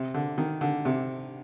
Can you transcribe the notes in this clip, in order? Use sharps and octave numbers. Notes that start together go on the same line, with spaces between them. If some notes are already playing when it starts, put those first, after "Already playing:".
Already playing: C3
D3
D#3
D3
C3